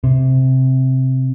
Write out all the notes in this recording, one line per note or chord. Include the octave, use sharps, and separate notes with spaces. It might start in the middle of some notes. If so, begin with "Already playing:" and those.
C3